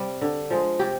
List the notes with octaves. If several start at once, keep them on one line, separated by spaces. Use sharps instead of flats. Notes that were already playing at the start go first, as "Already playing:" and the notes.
Already playing: C3 G3
D3
F3 G#3
C3 G4